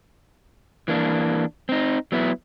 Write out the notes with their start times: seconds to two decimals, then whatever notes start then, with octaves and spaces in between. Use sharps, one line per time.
0.88 E3 A#3 D4
1.69 C4 D#4
2.12 F#3 B3 E4